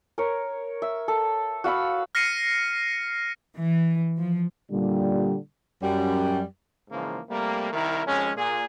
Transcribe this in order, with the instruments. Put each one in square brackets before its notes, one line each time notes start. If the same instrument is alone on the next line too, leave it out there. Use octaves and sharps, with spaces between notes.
[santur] A#4 C#5
E5
A4
F#4 F5 B5 E6
[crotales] F6 A#6 C7 C#7 D#7
[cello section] E3
F3
[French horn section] A#2 D3 G3
[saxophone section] F#2 G3
[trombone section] G#2 C#3 E3 F3 A#3
C3 G3 A3 A#3
C2 D#3 E4 A#4
G#1 F2 G#3 C#4
A#2 G#4